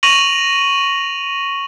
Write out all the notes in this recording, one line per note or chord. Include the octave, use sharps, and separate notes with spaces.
C#6 A#6 D#7 F7 F#7